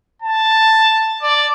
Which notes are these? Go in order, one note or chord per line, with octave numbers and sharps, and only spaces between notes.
A5
D5